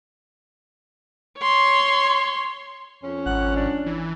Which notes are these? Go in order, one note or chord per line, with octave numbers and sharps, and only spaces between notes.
C#5 C6
F2 C#4
G#1 F#5
D4
E3